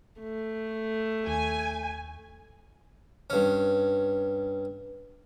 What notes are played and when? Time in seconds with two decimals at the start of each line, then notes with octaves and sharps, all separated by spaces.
0.20 A3
1.27 D#2 G#5
3.30 G2 C#4